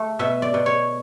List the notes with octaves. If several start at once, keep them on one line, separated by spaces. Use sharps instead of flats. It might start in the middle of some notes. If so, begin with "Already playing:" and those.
Already playing: A3
B2 E5
D5
B2
C#5